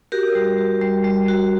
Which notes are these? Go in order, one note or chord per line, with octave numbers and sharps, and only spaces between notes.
F#4 G4 A#4
G3
F#4
G3
G3
F#4